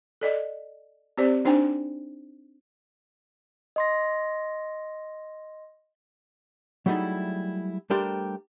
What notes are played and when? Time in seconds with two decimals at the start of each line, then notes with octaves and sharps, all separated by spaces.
0.21 A4 D5 D#5
1.18 C4 G4 C5 D5
1.45 D4 D#4 C5 G5 G#5
3.76 D#5 C6 A#6
6.86 F#3 G3 A3 D#4 E4 G#4
7.90 G3 A3 D4 G4 A#4 C5